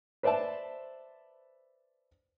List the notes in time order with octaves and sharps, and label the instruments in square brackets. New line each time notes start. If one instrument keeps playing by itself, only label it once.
[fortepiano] B4 C5 D5 E5 A5